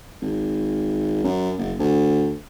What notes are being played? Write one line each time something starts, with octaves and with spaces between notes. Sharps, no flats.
G#1
F#2
F#1
D2